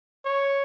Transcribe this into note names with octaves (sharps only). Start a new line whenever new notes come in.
C#5